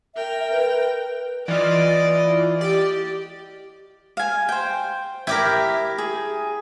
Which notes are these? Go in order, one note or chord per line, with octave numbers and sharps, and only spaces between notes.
A#4 E5 G5
B4
E3 F4 D5 D#5
G4 D5
F5 G#5
C5 G5
E4 G4 A#4 G5
G#4